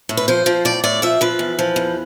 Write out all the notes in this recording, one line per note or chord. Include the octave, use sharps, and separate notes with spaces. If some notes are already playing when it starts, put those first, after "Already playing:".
A2
B4
F3 C5
F3
A2 D5
A2 D5
F3 E5
F3 B4
E2
F3
E2